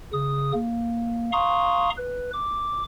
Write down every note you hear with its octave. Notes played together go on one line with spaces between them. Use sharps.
C#3 D#6
A#3
F5 A#5 C6 C#6 D#6
B4
D6